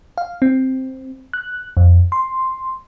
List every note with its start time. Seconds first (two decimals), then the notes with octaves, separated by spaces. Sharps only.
0.18 F5
0.42 C4
1.33 F#6
1.77 F2
2.12 C6